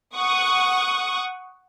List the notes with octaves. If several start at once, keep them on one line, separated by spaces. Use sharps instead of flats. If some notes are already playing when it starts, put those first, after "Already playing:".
F#5 C#6 D#6